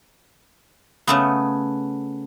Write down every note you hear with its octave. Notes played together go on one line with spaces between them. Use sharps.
C#3 A3 B3